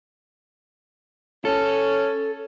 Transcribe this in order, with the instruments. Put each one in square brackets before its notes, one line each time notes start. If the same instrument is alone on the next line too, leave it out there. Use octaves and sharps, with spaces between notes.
[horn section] C#4 [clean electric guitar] A4